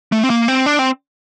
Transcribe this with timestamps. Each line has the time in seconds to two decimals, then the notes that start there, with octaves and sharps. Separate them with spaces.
0.12 A3
0.23 C4
0.30 A#3
0.48 C4
0.66 D4
0.79 C4